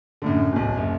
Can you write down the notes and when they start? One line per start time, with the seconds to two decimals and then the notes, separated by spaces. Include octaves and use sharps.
0.22 F#2 A2 D3
0.52 D1 B1
0.76 F#1 F#2